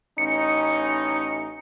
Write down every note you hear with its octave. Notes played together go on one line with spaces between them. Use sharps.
A1 C#4 D#4 C#7